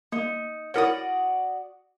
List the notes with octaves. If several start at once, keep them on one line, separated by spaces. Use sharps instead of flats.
A#3 D#4
E4 F#4 A#4 C#5 D5 D#6